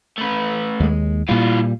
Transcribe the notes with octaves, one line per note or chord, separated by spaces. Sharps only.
A3 B4
D#2 G3 G#3
A#2 E3 G3 F4